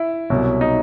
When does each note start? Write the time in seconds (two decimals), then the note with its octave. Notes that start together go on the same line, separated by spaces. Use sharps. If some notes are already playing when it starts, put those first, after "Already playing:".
Already playing: E4
0.30 C2 B2 F#3
0.61 D#4